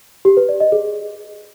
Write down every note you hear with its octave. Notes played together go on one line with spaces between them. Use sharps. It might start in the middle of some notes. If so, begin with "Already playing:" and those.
G4
B4
D5
D#5
G#4